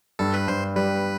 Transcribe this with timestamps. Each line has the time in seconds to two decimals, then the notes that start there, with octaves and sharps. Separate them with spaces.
0.19 G2 A4
0.34 B4
0.48 G2 C5
0.76 G3 B4